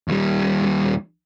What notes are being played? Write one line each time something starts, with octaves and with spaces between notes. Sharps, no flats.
D#2 G3